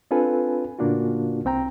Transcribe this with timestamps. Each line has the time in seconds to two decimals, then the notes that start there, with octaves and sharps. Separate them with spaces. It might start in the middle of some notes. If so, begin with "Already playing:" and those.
0.11 C4 D4 F4 A4 B4 G#5
0.79 A2 C#3 A#3 D4 F4 F#4
1.45 C2 C4 G5 A#5